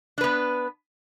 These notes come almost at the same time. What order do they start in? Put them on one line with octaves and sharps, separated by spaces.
D4 B4 B3